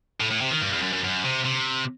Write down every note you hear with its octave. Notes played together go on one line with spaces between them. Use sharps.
A2
A2
C3
D#3
G2
E2
F#2
F#2
F#2
C3
C3